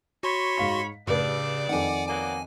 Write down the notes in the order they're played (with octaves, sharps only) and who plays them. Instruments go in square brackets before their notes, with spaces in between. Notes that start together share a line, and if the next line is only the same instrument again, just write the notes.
[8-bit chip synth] F#4 C6 [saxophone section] C#5 [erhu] B5
[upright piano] G#2 F5 B6
[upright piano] A1 B4 [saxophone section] G2 [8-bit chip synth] C#3 [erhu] D5
[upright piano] F2 D#3 [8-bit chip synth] F#5 G#5
[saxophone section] F#3 A#3 B3 [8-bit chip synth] G#5